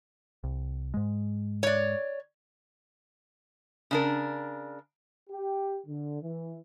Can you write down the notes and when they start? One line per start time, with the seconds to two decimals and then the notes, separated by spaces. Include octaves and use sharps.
0.44 C2
0.94 G#2 G#3
1.63 C#5 D5
3.91 C#3 D4 A#4
5.30 G4
5.87 D3
6.22 E3